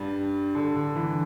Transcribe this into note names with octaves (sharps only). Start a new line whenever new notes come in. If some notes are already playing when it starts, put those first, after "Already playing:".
Already playing: G2 G3
D3
D3
E3